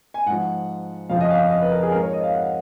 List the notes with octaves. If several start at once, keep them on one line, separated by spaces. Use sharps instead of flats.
G#5
G#2 F3 F#5
F2 C#3 F3 F5
D#5
F5
D#5
B4
A#4
G#4
G#2 F3 A#4
C#5
D#5
F5
F#5